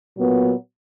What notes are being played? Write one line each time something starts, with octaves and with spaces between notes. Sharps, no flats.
A#2 F#3 B3